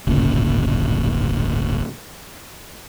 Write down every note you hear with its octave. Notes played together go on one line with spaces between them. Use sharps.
D1 G1 A#2 C#3